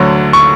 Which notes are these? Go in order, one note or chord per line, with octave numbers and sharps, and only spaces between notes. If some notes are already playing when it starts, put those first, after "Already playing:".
Already playing: D2 D3 F#3
C#6